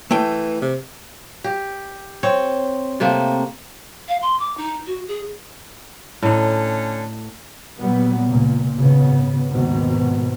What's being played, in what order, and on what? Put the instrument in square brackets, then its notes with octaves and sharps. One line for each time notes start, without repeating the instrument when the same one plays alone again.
[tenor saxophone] E3 [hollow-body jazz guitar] A3 G5
[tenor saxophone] C3
[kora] G4
C4 C#5
C3 A3 A#3 C4
[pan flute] F5
C6
D6
D#4
F#4
G#4
[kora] A2 D#4 [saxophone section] D3 C#4
[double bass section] A#2 F#3 G3 B3
C#2 A#2
G#1 C#3 B3
G#1 D#2 G#2 B2 D#3